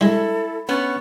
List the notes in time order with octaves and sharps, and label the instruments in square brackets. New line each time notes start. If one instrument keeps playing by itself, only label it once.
[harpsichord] G3 G#3 [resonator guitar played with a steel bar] E4 [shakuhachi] A4
[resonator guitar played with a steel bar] B3 C#4 [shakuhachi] C#6